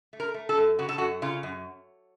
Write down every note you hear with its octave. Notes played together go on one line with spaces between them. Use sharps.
A3
A#4
A3
A4
F#2
C#3 F#4
A4
F#2 F#4
C#3 F4
F#2